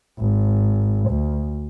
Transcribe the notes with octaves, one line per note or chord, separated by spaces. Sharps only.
G#1
D2